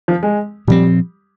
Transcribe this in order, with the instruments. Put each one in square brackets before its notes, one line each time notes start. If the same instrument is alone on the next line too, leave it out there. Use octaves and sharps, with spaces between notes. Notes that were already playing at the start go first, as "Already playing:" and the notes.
[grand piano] F3
G#3
[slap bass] A#2 F3 C4 [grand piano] G3